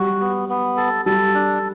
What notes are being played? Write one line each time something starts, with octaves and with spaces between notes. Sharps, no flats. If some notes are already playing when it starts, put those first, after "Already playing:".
Already playing: G3 F#4
B3
B3
A4
G3 A4
D4